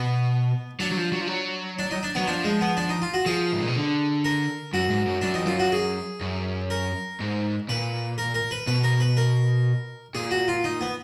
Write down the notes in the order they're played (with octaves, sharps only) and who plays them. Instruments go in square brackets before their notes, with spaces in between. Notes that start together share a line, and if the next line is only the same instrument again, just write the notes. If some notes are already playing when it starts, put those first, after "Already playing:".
Already playing: [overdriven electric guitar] B2 [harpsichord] B3
[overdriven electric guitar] F#3 [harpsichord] D4
[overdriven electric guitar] F#3
F3
F#3
F3
F#3
[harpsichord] D4
D#4
D4
[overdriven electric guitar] F#3 [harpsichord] B3
[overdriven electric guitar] F3 [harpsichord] D4
[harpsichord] G#3
B3
D4
D#4
F4
F#4
[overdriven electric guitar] F3 [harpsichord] G#4
[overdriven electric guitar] G#2
A#2
B2
D3
[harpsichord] A#4
[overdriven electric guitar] F#2 [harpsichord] F#4
[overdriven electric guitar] G#2
F#2
[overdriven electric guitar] F#2 [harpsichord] D4
[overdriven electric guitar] F2 [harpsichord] D#4
[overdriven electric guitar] F#2 [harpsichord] F4
[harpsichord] F#4
G#4
[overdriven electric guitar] F#2
[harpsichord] A#4
[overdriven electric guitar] G#2
[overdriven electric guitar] A#2 [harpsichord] B4
[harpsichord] A#4
A#4
B4
[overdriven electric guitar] B2 [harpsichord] B4
[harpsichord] A#4
B4
A#4
[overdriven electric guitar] A#2 [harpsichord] G#4
[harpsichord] F#4
F4
D#4
B3